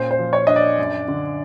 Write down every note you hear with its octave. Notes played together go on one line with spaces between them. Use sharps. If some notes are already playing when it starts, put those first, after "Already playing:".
Already playing: A#2 C#4 C5
C5
F3
C#5
D4 D#5
D5
F#2
D3